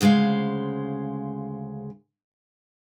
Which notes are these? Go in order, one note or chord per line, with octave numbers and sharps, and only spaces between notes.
D2 C#3 G#3 C5 F5